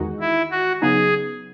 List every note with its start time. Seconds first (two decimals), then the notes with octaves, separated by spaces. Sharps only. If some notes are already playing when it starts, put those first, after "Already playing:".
Already playing: E2 D#3 G#3 D#4 F#4
0.20 E4
0.51 F#4
0.82 C#3 F#3 B3 D#4 G#4